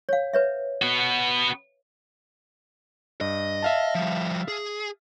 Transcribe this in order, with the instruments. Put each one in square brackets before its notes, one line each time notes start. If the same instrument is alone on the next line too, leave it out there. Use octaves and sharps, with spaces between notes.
[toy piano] C#5 F5
B4 C#5 E5
[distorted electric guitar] B3 F#4
[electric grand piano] G2 [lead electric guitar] D#5
[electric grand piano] E5 F5 A5
[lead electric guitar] F3 G3
G#4